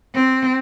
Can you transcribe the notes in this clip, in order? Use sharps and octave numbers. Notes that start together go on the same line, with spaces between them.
C4